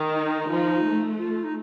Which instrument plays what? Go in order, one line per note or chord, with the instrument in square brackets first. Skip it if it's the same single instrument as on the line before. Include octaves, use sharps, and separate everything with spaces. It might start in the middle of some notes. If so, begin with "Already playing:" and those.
Already playing: [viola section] D#3
[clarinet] D#4
[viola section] F3
A3
[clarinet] F4
D#4